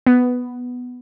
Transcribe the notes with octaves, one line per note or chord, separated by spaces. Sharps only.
B3